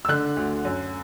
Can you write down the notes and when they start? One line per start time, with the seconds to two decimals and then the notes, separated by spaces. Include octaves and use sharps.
0.05 E6
0.08 D3 F#6
0.36 D2
0.65 F#2